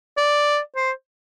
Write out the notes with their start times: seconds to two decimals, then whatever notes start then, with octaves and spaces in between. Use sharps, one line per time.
0.17 D5
0.76 C5